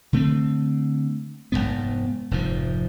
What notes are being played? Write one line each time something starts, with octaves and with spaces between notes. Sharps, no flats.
D3 A3 C4
F1 E2 G#2 B3
F1 G#2 F3